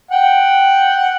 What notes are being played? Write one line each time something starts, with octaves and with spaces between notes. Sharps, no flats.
F#5 G5